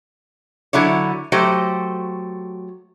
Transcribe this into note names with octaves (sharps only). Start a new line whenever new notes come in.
D3 F#3 E4 C#5
F#3 A3 G4 C5